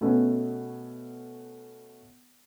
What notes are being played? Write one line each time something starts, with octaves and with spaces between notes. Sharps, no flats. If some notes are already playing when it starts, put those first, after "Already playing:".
B2 A3 B3 C#4